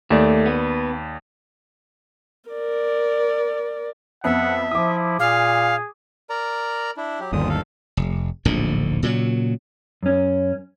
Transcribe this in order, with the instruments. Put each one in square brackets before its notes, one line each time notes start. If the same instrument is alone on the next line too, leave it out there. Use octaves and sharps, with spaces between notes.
[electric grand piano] D#2 D5 [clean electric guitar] A3
[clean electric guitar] B3
[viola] A#4 D5
[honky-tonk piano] F2 B3 [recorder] E5 [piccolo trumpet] F#5
[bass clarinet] F3 [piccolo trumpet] E4 [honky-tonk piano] D6 D#6
[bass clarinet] A#2 [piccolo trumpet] G#4 [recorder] F5
[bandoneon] A#4 D5 A#5
D4 E4
F#3 G4
[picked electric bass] G1 D#2 [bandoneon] A#2 D3 D#6
[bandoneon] A4 F5
[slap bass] F1
D1 A#1 G#2 D3
A#2 C#3 F3 F#3
[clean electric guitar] F#2 C#4